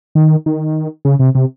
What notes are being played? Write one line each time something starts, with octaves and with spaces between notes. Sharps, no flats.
D#3
D#3
C#3
C3
C3